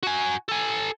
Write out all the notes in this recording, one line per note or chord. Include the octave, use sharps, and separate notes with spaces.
F#4 G#5
A4 G#5